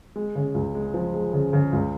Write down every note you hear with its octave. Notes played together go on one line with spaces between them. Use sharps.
G#3
C#3
C#2
G#3
F3
G#3
C#3
C#3
C#2